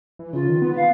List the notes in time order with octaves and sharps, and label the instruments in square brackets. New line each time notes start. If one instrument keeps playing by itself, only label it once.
[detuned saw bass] E3
[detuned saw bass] C#3 [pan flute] F4
[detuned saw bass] D#3
B3
[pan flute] F5